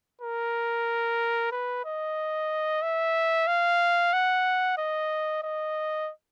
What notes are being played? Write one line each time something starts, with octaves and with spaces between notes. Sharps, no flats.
A#4
B4
D#5
E5
F5
F#5
D#5
D#5